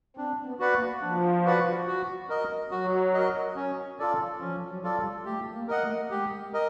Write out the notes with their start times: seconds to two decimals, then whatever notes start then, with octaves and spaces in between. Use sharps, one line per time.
0.16 C4 D4
0.45 B3
0.59 F#4 B4 D5 F#5
0.74 A#3
1.01 F3 D4
1.45 F#4 B4 D5 F#5
1.87 F#4
2.29 A#4 D#5
2.71 F#3 F#4
3.14 A#4 D#5
3.56 C#4
3.99 F4 A4 D5
4.41 F3 C#4
4.70 F#3
4.83 F4 A4 D5
4.98 G3
5.25 A3 G4
5.54 A#3
5.68 A#4 D#5 F#5
5.82 A3
6.11 G#3 G4
6.53 A#4 D#5